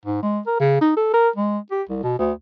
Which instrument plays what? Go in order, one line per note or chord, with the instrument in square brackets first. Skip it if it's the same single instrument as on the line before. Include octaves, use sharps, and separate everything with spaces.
[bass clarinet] G#2
G#3
A#4
C#3
D#4
A4
A#4
G#3
G4
C2
B2
D2